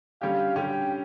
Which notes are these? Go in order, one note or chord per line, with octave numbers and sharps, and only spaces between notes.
D3 G3 C#4 G4 F5
D3 G3 C#4 G4 G5